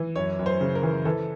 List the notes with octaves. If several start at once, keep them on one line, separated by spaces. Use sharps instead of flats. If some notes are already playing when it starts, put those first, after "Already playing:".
Already playing: E3
F#2 C#5
F#2
C5
C#3
A#4
E3
E3 A4